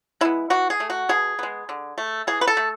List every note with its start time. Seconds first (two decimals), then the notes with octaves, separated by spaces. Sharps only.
0.21 G#3 B3 E4
0.50 E3 F#4
0.70 G#4
0.80 A3
0.90 F#4
1.09 B2 G#4
1.39 G#3 B3
1.69 D3
1.98 A3
2.27 E3 G#4
2.41 B4
2.47 A4
2.57 A3